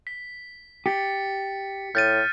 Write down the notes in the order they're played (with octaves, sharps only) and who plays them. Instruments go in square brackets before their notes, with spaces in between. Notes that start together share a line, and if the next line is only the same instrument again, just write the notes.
[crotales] B6
[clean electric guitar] G4 [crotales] A6 B6 C#7
[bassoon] A2 [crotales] F6 [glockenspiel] G6 A6 D#7